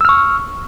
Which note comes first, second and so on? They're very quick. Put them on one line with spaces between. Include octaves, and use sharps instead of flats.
E6 F6 C#6